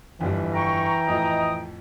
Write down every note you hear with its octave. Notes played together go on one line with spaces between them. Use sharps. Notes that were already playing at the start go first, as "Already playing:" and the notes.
G1 F2 E3 G3
G5 A#5 C#6
F2 A2 F3 D#5 D#6